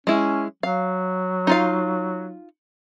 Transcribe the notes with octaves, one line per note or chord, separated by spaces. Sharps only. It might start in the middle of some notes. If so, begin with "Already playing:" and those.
G#3 C#4 E4
F#3 F5
D#4 F4 F5